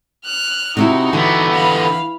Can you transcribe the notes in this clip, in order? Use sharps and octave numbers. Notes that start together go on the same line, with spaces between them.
F6 F#6
C3 C4 D#4 E4 F#4
D3 E3 B3
F5 B5